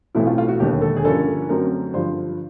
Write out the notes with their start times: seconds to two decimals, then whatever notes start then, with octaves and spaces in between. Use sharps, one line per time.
0.15 B1 A2 E3 A3 C4 E4
0.27 F4
0.38 F4
0.48 F#4
0.60 E1 D#2 D3 G4
0.82 A4
0.96 G#4
1.05 G2 D3 F3 A#3 C#4 A4
1.49 F#2 D3 F#3 A3 C4 A#4
1.94 G2 D3 F3 C5